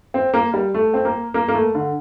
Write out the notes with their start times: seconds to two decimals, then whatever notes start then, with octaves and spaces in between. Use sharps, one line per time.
0.14 C4
0.34 A#3
0.54 G3
0.74 A3
0.94 C4
1.05 A#3
1.34 A#3
1.48 A#3
1.54 A3
1.75 D3